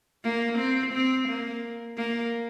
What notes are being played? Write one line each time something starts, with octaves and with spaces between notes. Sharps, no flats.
A#3
C4
C4
A#3
A#3